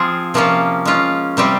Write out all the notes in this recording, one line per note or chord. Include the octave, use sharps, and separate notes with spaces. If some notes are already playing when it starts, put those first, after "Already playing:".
Already playing: F3 C4 F4 G#4
C3 F3 A#3 C#4 F4
G#3 C#4 F4
C3 G3 C4 G4